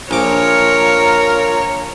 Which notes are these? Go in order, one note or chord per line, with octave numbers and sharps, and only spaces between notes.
A#1 F4 A#4 C#5 D6